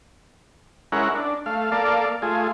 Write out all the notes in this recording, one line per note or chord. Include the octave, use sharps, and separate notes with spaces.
G#3 C#4 E4 A#4 F#5
D4
A3 F5
A#3 A4 D5 F5
A3 F4 G#4